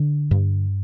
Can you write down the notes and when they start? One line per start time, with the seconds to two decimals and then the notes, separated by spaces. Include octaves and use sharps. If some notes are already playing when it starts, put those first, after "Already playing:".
Already playing: D3
0.31 G2